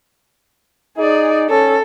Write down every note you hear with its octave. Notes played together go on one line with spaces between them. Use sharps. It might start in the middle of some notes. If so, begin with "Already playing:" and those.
D#4 G#4 D5
C#4 A4